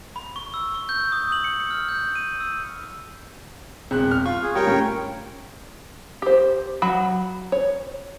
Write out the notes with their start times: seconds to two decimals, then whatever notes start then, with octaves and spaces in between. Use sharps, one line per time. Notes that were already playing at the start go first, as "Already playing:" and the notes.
0.16 B5
0.36 C#6
0.54 E6
0.75 C#6
0.89 G6
1.12 D#6
1.32 F#7
1.44 C#7
1.71 F6
1.89 G6
2.15 D#7
2.40 E6
3.91 E1 C4 F#6
4.11 F6
4.26 F4 C#6
4.42 G#4
4.55 G3 A#4 C#5 G5
4.67 A2 C#4
6.22 G4 C5
6.82 F#3 B5
7.52 C#5